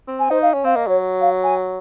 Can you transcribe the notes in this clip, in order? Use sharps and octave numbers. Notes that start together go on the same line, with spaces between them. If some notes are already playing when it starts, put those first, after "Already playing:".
C4
G#5
D#4 C5
F5
C#4
C4 F5
A#3 D#5
F#3 C#5
F5
G#5